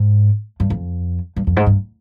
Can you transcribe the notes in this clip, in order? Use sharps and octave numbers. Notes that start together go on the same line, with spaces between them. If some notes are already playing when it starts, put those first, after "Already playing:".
Already playing: G#2
G2
F2
G2
F2
G#2
G2